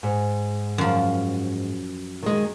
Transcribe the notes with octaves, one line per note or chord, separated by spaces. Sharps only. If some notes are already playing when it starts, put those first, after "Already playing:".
G#2
F#2 F3
D#3 G#3